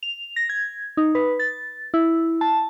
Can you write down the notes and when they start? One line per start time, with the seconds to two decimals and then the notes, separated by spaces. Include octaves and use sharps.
0.03 F7
0.36 A#6
0.49 G#6
0.97 D#4
1.15 B4
1.39 A6
1.94 E4
2.41 A5